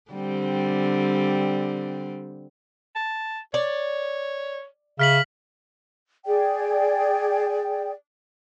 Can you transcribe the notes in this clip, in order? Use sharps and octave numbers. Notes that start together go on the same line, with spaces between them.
D3 G3 C4
A5
C#5 D5
C#3 E5 F6 B6 F#7
G#4 D5 G5